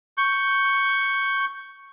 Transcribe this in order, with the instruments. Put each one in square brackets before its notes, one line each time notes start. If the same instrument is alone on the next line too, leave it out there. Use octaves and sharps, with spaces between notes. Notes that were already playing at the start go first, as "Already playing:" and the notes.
[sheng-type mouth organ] C#6 G6